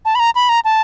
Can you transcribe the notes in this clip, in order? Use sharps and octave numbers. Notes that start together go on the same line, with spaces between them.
A5
B5
A#5
B5
A#5
A5